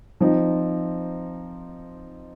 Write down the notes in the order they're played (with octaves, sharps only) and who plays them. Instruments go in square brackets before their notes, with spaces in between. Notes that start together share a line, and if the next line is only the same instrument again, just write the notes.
[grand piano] F3 C4 D#4